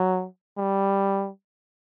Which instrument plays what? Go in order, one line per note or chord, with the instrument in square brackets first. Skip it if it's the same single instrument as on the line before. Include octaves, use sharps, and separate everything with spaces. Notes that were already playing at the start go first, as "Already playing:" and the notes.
Already playing: [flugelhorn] F#3
G3